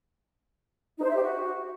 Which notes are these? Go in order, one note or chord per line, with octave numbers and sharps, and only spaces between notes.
D#4
C5
E5
G4
F#4